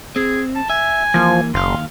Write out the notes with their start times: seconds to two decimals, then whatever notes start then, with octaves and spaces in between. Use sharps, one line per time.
0.16 C4 G#4
0.55 A5
0.70 E5 G#5
1.14 E3 F3 A#3
1.54 F#1 D#2 F5 C6